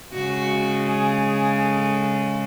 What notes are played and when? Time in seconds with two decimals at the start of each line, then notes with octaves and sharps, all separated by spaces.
0.14 C#3 G#3 F#4
0.88 G#4
1.24 G#4
1.61 A4